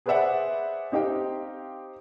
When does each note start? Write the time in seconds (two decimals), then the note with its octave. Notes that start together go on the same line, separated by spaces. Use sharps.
0.06 G#4 B4 C5 D5 E5 F#5
0.92 C4 D#4 G4 F5 G5